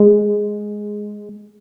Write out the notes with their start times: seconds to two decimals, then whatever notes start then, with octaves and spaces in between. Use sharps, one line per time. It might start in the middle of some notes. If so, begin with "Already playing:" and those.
Already playing: G#3